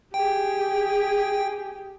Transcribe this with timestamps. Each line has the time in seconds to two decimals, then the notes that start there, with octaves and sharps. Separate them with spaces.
0.14 G4 G#4 G5